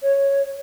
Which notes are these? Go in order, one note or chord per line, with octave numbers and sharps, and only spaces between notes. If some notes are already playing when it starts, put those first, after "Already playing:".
C#5